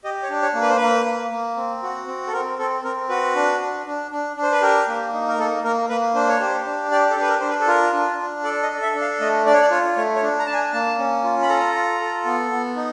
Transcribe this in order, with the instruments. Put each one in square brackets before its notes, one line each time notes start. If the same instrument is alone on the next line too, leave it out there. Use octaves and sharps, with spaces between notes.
[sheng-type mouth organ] G4 D#5
C#5
D4
C#5
A#3
B4
C5
A#3 B4
A#3
A#3
C4
F#4
C4
A4
C4 A#4
C4 A4
C4 A#4
F#4 B4
D4
D4
D4
D4
D4
C5
B4
G4 A#4
A#3
D#4
A#4
A#3 A4
A#3 A#4
A#3 B4
D4 C5
C#5
G4 C5
D4
G4 D5
A4
D4 B4
A#4
D4 C5
B4
A4
F4 A#4
D4
D4
A4 D5
D#5
A4
E5
D4
F5
A3 D#5
D4 D5
C#5
D5
F4 C#5
A3 C#5
C#5
D4
A#5
D4 A5
G#5
A#3 A5
C#4
F4
B5
A4 A#5
F4
A4
B3
B3
D#4